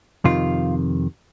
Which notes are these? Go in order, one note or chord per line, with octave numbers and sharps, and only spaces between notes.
F2 C3 D#3 F4